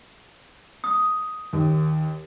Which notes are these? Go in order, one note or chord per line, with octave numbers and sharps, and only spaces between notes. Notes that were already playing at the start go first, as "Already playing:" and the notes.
D#6
D#2